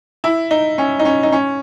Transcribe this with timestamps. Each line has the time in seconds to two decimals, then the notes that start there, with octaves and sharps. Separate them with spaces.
0.24 E4
0.51 D#4
0.78 C#4
0.99 D#4
1.05 C#4
1.23 D#4
1.32 C#4